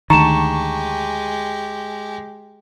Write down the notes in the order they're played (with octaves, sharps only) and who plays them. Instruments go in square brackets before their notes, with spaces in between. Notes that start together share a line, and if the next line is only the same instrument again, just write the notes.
[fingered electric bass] D2 D#3 [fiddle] G#3 G4 [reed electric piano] A5 C#6 [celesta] A#5 E7